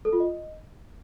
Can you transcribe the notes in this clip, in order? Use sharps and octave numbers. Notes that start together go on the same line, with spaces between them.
A4
F4
D#5